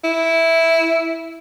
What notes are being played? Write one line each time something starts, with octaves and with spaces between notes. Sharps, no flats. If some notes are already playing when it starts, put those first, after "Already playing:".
E4